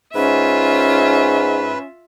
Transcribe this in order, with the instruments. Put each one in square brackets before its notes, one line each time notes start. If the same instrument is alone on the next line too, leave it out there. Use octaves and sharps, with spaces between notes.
[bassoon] G#2 [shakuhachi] C#4 [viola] F4 E5 [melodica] B4